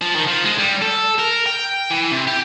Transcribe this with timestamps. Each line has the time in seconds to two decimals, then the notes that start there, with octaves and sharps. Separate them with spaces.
0.01 F3
0.15 D#3
0.28 F3
0.45 G#3
0.58 G3
0.82 A4
1.19 A#4
1.47 G5
1.91 E3
2.12 C3
2.28 G4